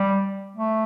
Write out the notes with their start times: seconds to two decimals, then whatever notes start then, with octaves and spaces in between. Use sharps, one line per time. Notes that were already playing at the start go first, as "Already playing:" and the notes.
Already playing: G3
0.57 A3